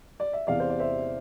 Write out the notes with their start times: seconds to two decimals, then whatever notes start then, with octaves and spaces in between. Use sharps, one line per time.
0.20 D5
0.33 E5
0.47 E2 C3 E3 D5 F5
0.60 C5
0.70 D5
0.80 C5 E5